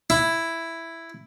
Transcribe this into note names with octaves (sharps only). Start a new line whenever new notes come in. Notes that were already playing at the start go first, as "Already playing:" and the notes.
E4